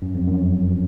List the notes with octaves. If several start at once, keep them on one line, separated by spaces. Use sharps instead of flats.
F#2
F2
F#2